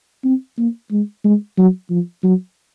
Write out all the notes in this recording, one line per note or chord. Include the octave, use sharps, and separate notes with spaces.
C4
A#3
G#3
G#3
F#3
F3
F#3